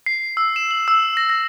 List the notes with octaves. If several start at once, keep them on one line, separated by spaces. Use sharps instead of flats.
C7
E6
E7
F#7
E6
A#6
A#6